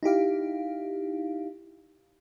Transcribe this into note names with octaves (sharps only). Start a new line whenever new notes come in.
D#4 E4 G4 F5